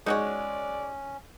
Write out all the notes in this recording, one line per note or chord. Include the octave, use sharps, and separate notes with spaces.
G#3 C#4 D#4 F#4 C#5 D5 F#5